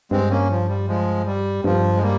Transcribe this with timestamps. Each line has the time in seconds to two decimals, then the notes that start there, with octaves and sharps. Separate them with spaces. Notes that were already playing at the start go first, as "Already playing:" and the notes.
0.11 G2 G#3 C4
0.31 A#3 C#4
0.50 F3
0.69 G3
0.88 F3 G#3
1.26 G3
1.64 G2 F3
1.97 G#3
2.02 G3 A#3